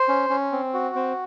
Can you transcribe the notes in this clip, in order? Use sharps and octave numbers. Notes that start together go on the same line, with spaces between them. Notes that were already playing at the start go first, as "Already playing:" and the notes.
Already playing: C5
C#4
C#4
C4
F#4
C4